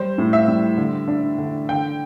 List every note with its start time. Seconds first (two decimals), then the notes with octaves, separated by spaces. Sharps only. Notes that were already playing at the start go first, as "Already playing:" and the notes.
Already playing: G3 C5
0.18 A2
0.33 E5
0.48 G3
0.77 D3
1.08 D4
1.38 D3
1.69 D3 G5